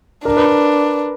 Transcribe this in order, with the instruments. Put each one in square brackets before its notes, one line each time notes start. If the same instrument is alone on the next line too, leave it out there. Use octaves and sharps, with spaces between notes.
[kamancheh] D4 [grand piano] A#4
[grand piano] B4